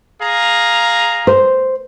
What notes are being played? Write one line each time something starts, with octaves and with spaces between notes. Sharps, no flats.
G#4 F5 A#5
C5